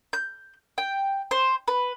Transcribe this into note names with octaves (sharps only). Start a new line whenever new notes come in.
G6
G5
C5
B4